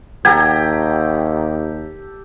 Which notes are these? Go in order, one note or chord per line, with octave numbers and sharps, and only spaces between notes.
D#2 G4 A4 F#5 G5 A#5 G#6